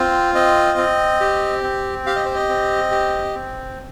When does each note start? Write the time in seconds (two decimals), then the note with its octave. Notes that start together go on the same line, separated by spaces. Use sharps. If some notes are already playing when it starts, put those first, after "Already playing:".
Already playing: C4 F4
0.35 C4 D#5
0.78 C4
1.21 G4
1.63 C4
2.06 G4 F5
2.16 D#5
2.25 C5
2.35 D#5
2.49 C4
2.91 G4
3.35 C4